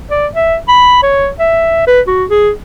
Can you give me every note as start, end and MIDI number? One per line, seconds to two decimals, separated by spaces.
0.11 0.27 74
0.35 0.56 76
0.69 0.99 83
1.03 1.29 73
1.40 1.85 76
1.87 2.01 71
2.08 2.25 66
2.30 2.51 68